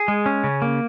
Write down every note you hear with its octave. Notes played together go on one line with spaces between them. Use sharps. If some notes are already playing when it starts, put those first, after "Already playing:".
Already playing: G#4
G#3
C#4
C#3
A#3